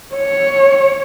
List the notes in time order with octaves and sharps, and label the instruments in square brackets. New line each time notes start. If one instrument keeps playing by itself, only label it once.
[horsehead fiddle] C#5